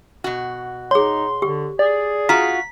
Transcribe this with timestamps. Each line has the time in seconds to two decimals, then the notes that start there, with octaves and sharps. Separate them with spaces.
0.24 B2 F#4
0.91 D#4 G#4 C#5 C6
1.42 D3 G4
1.79 G#4 D5
2.29 F4 F#4 A#5 B6